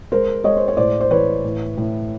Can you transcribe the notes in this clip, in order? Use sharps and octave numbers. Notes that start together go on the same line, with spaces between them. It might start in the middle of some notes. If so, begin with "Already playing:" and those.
G#3 A#4 C5
G#3 C#5 D#5
C5
C#5
A2 C5 D5
C5
E3 B4 C#5
A2
A2